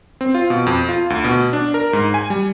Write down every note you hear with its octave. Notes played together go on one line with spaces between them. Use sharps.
C4
F4
B2
F2
F4
D2
B2
D4
A#4
G#2
G#5
G3